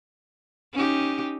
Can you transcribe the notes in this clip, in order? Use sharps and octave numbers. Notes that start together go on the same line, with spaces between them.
C#4 D#4 G4